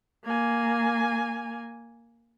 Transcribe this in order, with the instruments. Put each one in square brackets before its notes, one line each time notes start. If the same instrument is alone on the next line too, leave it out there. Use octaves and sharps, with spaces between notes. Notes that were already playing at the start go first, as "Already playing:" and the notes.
[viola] A#3 G#5